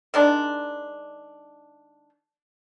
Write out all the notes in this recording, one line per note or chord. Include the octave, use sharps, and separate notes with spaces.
D#3 G#3 D4